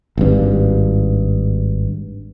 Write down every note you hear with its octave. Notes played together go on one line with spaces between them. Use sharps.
G#1 G2